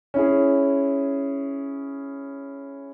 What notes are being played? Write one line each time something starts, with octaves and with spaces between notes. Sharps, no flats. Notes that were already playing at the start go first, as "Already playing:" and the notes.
C#4 E4 G#4